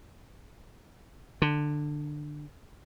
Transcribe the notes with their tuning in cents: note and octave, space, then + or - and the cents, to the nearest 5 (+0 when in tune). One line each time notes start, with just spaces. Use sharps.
D3 +15